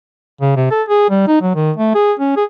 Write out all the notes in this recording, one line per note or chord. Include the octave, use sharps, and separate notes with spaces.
C#3
C3
A4
G#4
G3
D#4
F#3
D#3
A3
G#4
C#4
G#4